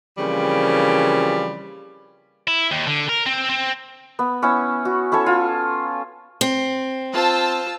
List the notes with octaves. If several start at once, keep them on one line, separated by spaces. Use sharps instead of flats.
C#3 E3 F3 G3 A#3 C4
E4
D#2
D3
A#4
C4
C4
B3
B3 C#4 E4
F#4
C#4 E4 A4 C#5
F4
C4
F4 C5 A5 E6